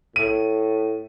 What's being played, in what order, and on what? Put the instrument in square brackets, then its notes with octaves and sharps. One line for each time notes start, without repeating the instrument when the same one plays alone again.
[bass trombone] A2 [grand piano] D#7